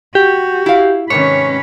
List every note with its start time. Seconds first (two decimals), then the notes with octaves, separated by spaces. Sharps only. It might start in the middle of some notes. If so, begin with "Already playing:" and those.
0.15 F#4 G4
0.66 E4 F5
1.10 G#2 C3 D#3 C#4 B4 C#5